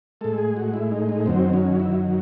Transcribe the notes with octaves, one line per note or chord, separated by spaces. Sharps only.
A2 G#3 A4
G#4
F#4
E4
D#4
D#4
F#2 D#3 F#3 C4
C#4
E4